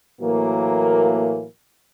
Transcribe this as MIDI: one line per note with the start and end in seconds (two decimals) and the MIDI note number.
0.21 1.45 45
0.21 1.45 52
0.21 1.45 54
0.21 1.45 58